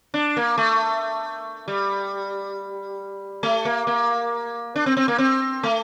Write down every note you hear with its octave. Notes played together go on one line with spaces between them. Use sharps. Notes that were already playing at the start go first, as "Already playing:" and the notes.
D4
A#3
A3
G3
A3
A#3
A#3
D4
C4
C4
A#3
C4
A3